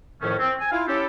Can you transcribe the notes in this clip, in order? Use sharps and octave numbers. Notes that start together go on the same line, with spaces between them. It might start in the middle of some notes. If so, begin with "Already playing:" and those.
F2 A2 D#3 F3 A3 C#4
C4
G#5
E4 F4 F5
C#4 E4 G4 A4